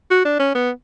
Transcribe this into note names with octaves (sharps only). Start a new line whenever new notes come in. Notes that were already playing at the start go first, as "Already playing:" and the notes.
F#4
D4
C#4
B3